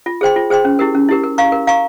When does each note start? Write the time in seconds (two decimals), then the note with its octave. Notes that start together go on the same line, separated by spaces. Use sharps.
0.06 F4
0.21 G#4 C5 G5 C6
0.36 F4
0.50 G#4 C5 G5 C6
0.65 C#4
0.79 E4 G4 A#4
0.95 C#4
1.09 E4 G4 A#4
1.24 A#4
1.38 F5 A#5 C#6
1.52 A#4
1.67 F5 A#5 C#6